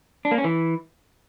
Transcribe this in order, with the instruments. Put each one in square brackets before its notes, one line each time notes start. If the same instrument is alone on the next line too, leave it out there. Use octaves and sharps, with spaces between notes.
[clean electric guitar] D4
A#3
C#4
E3